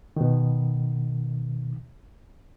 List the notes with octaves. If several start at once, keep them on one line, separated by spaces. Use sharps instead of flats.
B2 D#3